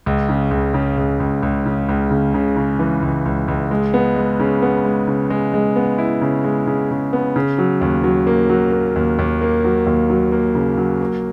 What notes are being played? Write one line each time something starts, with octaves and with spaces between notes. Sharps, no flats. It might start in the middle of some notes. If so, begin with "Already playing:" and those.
C#2
C#3
C#2
C#3
C#2
C#2
C#2
C#3
C#2
C#3
C#3
C#3
E3
C#2
C#2
C#2
G#3
B3
G#3
C#3
B3
G#3
C#3
G#3
G#3
B3
E4
C#3
G#3
C#3
C#3
B3
C#3
F#3
D#2
F#3
A#3
F#3
A#3
D#2
D#2
A#3
F#3
D#2
F#3
A#3
C#3
F#3
A#3